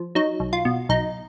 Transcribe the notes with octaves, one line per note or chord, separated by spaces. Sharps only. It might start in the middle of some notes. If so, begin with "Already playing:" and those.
Already playing: F3
F#3 D#4
B1
F4
B2
B1 D#4